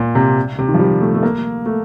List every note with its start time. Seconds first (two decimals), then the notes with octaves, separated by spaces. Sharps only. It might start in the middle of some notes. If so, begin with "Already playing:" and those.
Already playing: A#2
0.15 C3
0.58 C3
0.69 D#3
0.74 F3
0.79 G3
1.01 A3
1.14 A3
1.23 A#3
1.66 A3